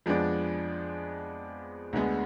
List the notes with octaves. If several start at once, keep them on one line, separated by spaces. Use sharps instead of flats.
F2 F3 G#3 B3 D4
D2 D3 G#3 B3